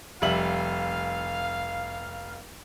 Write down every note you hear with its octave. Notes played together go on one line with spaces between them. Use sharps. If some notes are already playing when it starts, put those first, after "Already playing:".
F1 G3 E5 F5 F#7